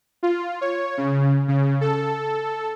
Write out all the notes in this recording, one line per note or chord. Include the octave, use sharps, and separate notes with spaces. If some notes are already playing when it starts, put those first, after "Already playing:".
F4
C#5
C#3
C#3
A4